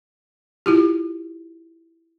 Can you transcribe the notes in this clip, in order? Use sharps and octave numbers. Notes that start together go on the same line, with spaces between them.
E4 F4 G4